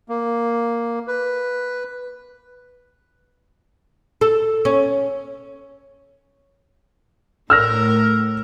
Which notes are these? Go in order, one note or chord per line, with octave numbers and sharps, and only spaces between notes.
A#3
B4
A4
C#4
A2 A#4 E6 F6 A#6